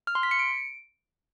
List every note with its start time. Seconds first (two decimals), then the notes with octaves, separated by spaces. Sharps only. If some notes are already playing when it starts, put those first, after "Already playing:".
0.07 F6
0.15 C6
0.23 B6
0.31 C#7
0.39 D7